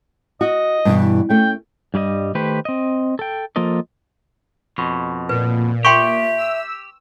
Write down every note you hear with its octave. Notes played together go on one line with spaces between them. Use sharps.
F#4 D#5
G2 B2 E3
A3 C#4 G5
G2 G3 G#4 D#5
D#3 A3 G4 B4 C5
C4 D#5
A4 G5
F3 A#3 F4 A4 D#5
F2 B2
A#2 B4
G4 E5 G5 C6 C#6
E6